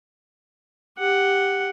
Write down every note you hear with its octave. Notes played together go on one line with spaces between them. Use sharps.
G4 F#5